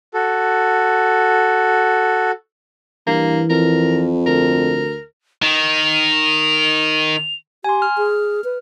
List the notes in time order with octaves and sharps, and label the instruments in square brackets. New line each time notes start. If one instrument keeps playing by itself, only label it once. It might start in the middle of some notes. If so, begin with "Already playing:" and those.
[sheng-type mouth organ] F#4 A4
[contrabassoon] G2 [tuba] E3 [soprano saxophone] A#3
[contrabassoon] F2 [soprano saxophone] A#4
[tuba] D2 [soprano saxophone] A#4
[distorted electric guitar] D#3 [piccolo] F7
[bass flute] G4 [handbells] G#5 C6
[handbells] F6
[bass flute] G#4
B4